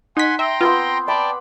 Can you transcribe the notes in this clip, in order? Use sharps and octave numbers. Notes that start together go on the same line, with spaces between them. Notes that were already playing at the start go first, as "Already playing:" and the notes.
D#4 F#5 G#5 C6 B6
E5 G5 A#5 C6
B3 C4 F4 C5
D5 G5 A5 B5 D6